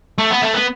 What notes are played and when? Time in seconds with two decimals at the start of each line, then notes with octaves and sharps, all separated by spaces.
0.18 A3
0.31 B3
0.42 A3
0.54 B3